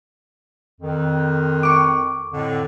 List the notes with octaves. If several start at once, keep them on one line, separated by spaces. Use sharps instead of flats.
F2 D#3
C#6 D6
F2 A2 D3